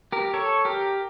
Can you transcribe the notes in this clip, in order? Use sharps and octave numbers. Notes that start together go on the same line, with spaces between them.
G4 A#4
A4 C#5
G4 A#4